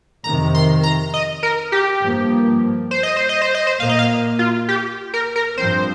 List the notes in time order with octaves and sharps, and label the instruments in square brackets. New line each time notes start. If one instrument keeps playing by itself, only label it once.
[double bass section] F2 C3 D#3 [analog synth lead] A#5
[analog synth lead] C6
A#5
D#5
A#4
G4
[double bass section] G2 F3 A#3
[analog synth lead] C5
D#5
C5
D#5
C5
D#5
C5
[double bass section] A#2 A#3 [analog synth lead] F5
[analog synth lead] D#5
F5
F4
G4
A#4
A#4
[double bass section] G2 F3 C4 [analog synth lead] C5